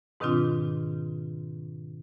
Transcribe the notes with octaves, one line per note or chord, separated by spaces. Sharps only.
G#2 B2 D#3 C4 D4 F4